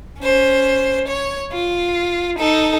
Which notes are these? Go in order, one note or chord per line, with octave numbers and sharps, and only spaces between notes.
C#4 C5
C#5
F4
D#4 A4